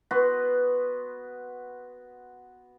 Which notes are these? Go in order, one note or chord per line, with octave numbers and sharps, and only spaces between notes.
B3 F#4 B4 C6